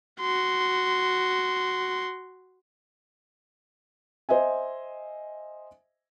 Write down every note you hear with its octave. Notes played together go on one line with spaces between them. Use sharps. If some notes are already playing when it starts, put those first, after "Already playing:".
F#4 C6
C5 D#5 E5 G#5